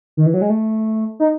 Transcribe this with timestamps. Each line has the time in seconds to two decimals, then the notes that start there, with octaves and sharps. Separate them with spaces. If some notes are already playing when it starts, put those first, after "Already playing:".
0.17 D#3
0.26 E3
0.34 F#3
0.42 G#3
0.50 A3
1.20 D#4